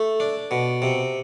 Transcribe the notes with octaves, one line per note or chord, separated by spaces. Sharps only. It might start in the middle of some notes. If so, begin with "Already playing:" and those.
Already playing: A3
D4
B2
C3